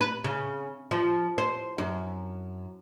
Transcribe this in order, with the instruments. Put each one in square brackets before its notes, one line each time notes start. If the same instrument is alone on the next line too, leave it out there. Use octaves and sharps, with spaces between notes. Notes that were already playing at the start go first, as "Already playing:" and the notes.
[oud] B4
C#3
F3
C5
F#2